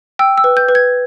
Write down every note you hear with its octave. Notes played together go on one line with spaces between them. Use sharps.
G5 E6
E6
B4
G6
B4
G#6